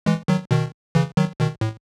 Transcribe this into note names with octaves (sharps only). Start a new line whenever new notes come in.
E3 G#3
D#3 F#3
B2 D#3
C#3 E3
D#3 F#3
B2 D#3
A2